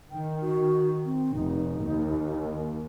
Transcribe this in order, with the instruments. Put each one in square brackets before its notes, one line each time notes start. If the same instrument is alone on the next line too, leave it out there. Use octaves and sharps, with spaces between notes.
[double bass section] D#3 [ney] G5
[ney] F#4
C4
[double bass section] F1 [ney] D#4
[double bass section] D#2